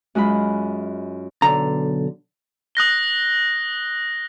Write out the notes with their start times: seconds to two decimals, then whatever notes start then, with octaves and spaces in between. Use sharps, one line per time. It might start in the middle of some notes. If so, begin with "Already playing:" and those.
0.15 F#2 G#3 F4 B5
1.42 B1 D3 A#5
2.75 D#6 F#6 A#6 G7